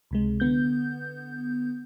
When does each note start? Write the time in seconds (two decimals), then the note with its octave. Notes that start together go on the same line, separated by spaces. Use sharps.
0.11 C#2 C3 G#3
0.40 D3 B3 G6